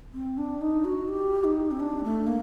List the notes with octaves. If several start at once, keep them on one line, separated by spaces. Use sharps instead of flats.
C4
D4
D#4
F#4
G4
D#4
C4
D4
A3
A#3